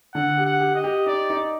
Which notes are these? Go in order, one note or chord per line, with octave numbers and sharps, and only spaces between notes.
D3 F#5
G4
F#5
G4
D#5
G4
D#4 D5
D#4